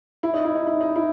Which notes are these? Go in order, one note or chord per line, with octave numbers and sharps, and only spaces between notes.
E4
D#4
E4
D#4
E4
D#4
E4